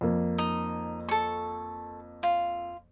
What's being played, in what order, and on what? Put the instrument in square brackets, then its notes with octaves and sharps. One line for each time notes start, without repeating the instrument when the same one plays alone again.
[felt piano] F2 A#3
[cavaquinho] D#4
A4 C#6
F4